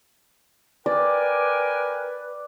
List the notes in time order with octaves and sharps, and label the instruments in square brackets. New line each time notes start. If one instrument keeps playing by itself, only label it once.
[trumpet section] A#4 G5 G#5 [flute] B4 [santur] D5